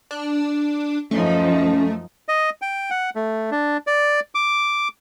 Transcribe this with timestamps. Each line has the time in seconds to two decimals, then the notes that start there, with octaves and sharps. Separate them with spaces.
0.11 D4
1.11 F#2 F3 A3 C#4 D#4
2.29 D#5
2.62 G5
2.90 F#5
3.15 A3
3.51 D4
3.87 D5
4.35 D6